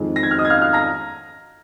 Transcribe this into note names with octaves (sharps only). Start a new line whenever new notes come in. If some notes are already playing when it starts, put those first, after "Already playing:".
Already playing: F2 D#3 G#3
A#6
G#6
F6
D#5 D#6
G#6
F5 F6
F5 F6
A#5 A#6